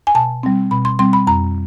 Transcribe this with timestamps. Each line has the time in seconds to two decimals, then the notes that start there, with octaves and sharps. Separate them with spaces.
0.07 G#5
0.15 B2 A5
0.43 G3 C4
0.71 B2 B5
0.85 C6
0.99 G3 C4 C6
1.13 B5
1.27 F2 A#5